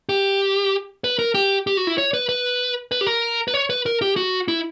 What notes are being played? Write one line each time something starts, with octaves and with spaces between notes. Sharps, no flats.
G4
B4
A#4
G4
G4
F#4
E4
C#5
B4
B4
B4
G4
A#4
B4
C#5
B4
A#4
G4
F#4
E4